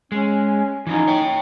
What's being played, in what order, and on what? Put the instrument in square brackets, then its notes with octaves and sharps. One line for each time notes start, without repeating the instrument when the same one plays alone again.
[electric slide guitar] G#3 [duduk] C#4
[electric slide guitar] E3 F3 C#4 [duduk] D#4
[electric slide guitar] C#5 G5